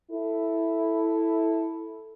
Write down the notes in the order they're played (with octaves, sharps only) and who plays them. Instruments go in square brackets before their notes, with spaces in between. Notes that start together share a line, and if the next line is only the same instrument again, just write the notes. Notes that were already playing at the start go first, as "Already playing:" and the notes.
[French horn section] E4 A4